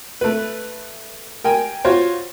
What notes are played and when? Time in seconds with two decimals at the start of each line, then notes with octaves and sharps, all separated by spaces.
0.21 A3 B4
1.44 A#4 G5 G#5
1.85 F4 F#4 C5 C#5